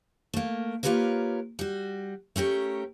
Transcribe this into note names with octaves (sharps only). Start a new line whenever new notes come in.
A3 A#3
A#3 F4 G4 A#4 B4 C#5
G3 F#4
A3 C#4 G4 A#4